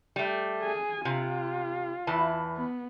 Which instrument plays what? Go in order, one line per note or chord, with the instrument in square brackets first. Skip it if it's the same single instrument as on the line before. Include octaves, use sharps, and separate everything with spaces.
[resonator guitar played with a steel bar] G3 A3
[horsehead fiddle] G#4 G#5
[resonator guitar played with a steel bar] C3 [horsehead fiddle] F4
[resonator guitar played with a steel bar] E2 E3 A5
[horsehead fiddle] B3